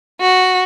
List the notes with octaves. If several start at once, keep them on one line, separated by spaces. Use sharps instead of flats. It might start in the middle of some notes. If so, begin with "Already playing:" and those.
F#4